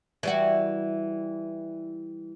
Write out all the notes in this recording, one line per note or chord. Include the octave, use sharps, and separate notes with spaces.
E3 G3 F#4